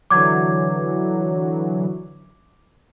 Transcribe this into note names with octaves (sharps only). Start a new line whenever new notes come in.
D3 E3 F#3 D6 G#6